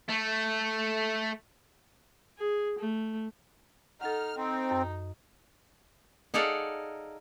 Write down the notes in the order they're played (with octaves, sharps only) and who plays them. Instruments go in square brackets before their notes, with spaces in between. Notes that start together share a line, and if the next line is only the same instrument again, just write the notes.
[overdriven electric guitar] A3
[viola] G#4
A3
[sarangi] D#4 [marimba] A4 F#5 [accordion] F6
[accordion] C4 [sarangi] D#4
[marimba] F#2
[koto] D#4 G#4 A4 D5 F5 F#5